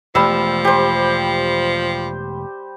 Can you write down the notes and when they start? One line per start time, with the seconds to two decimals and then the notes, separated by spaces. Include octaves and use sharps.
0.15 E1 F3 G3 A3 E6
0.65 G4 C5